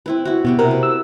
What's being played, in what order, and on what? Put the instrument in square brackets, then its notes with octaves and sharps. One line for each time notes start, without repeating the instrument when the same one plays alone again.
[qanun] C4 E4 B4
E4 F#4
[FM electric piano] B2 [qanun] B3 F#4 G4
[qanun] C3 A#3 F#5 [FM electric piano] A#4
[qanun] B4
[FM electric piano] E6